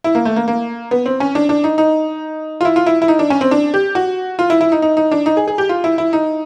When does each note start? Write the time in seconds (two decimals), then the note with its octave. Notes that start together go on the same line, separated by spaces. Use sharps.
0.04 E4
0.15 A#3
0.25 A3
0.36 A#3
0.48 A#3
0.91 B3
1.06 C4
1.20 C#4
1.35 D4
1.49 D4
1.64 D#4
1.78 D#4
2.61 F4
2.65 E4
2.76 F4
2.86 E4
3.02 E4
3.08 D#4
3.19 D4
3.30 C#4
3.41 C4
3.51 D4
3.74 G4
3.95 F#4
4.39 F4
4.50 E4
4.61 E4
4.72 D#4
4.82 D#4
4.97 D#4
5.12 D4
5.26 D#4
5.37 G#4
5.48 G#4
5.58 G4
5.69 F4
5.84 E4
5.98 E4
6.13 D#4